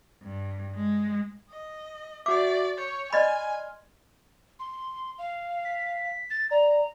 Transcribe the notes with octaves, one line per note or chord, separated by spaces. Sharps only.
G2
G#3
D#5
F#4 D5 E5 D6
C#5 G6
D5 D#5 G#5 B5 C6 F6 G#6
C6
F5
B6
A6
D5 A#5